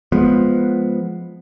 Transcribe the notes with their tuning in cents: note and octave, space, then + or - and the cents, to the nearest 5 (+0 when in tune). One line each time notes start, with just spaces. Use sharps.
F3 +0 G#3 +15 B3 +0